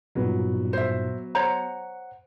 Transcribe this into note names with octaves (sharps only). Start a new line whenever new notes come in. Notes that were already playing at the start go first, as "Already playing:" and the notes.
G2 A#2 F#3 B3 D#4
C5 E5
C5 C#5 F#5 A#5